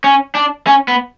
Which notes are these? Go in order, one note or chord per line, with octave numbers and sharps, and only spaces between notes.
C#4
D4
C#4
B3